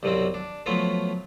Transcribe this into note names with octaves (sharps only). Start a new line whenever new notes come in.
C2 G2 B2 F#3 C4
D4
F3 F#3 A3 B3 F4